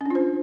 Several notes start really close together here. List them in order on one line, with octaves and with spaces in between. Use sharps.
C#4 D4 F4 C5